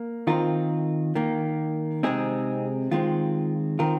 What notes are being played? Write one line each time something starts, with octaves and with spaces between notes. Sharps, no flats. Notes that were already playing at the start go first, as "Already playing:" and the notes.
Already playing: A#3
D#3 C4 F4 A#4
D#3 A#3
C3 G#3 C4 D#4 G#4
D#3 G#3 C4 F4
D#3 C4 F4 A#4